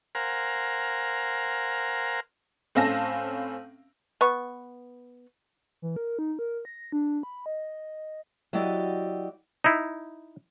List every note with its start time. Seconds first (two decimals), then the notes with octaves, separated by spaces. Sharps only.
0.15 A#4 C5 F5 F#5 G#5 A#5
2.75 A2 C4 C#4 F5 A5 A#6
4.21 B3 C#6
5.82 E3
5.96 A#4
6.19 D#4
6.39 A#4
6.65 A#6
6.92 D4
7.23 B5
7.46 D#5
8.53 F#3 E4 F#4 G4 D5 D#5
9.64 D#4 E4